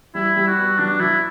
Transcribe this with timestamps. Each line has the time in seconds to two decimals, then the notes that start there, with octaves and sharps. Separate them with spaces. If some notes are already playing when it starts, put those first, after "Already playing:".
0.15 G3 E4
0.36 G3
0.47 F#4
0.58 B3
0.79 F#3 D4
1.00 F#3 E4